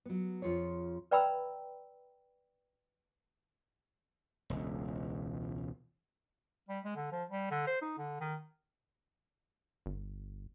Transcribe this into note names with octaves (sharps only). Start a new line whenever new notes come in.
F#3 B3
F2 F4 G#4 C#5
B4 D5 G5 A#5 B5 E6
E1 C#2
G3
G#3
D3
F3
G3
D3
C5
D#4
D3
D#3
G1